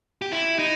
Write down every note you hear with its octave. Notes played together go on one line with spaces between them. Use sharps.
G4
E4
D#4